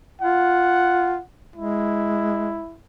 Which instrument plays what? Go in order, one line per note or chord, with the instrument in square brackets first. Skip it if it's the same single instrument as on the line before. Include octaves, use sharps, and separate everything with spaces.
[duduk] F4 [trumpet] F#5
[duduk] G#3 [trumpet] E4